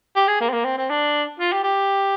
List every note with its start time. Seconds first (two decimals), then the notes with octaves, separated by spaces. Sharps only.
0.16 G4
0.28 G#4
0.41 A#3
0.49 C4
0.53 A#3
0.64 C4
0.78 C4
0.90 D4
1.40 F4
1.52 G4
1.63 G4